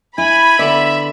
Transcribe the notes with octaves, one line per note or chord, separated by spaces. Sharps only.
E4 G#5 B5
D3 B3 D5 E5